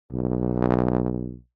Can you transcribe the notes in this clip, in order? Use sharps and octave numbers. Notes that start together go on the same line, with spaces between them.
B1